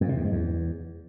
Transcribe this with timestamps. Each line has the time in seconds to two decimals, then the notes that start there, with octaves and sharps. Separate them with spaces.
0.01 F2
0.09 C3
0.17 E2
0.24 G#2
0.32 E2